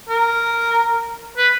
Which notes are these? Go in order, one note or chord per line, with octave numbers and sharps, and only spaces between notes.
A#4
B4